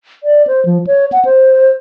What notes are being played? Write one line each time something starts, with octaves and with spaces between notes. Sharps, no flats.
D5
C5
F3
C#5
F#5
C5